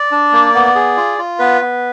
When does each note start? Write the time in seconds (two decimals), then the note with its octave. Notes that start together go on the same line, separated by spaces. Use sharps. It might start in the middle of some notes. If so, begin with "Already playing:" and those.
Already playing: D5
0.12 D4
0.33 A#3
0.55 B3
0.75 G#4
0.97 F4
1.18 F4
1.39 B3 B4
1.61 B3